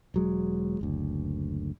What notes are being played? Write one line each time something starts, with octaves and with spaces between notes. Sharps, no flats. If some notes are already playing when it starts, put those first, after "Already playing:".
E1 F#3 G#3
F#1 D2